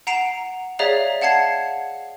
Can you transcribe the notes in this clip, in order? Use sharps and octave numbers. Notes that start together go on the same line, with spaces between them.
F#5 A#5 C7 D7 E7
G#4 C#5 D5 E5 F5 A#5
F5 F#5 A5 G#6 C7